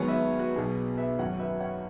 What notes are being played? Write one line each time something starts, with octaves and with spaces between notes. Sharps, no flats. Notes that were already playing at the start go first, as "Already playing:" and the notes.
Already playing: G#1 G#2 F#3 B3 G#4 C#5
B4 E5
F#4 B4
B1 B2 B3 G#4
B4 E5
G#1 F#2 F#3 C#5 F#5
B4 E5
C#5 F#5